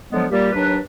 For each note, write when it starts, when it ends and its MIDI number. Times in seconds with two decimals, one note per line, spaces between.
0.13 0.25 50
0.13 0.25 53
0.13 0.25 54
0.13 0.25 56
0.13 0.25 59
0.31 0.49 46
0.31 0.49 55
0.31 0.49 58
0.31 0.49 67
0.52 0.76 39
0.52 0.76 54
0.52 0.76 62
0.52 0.76 71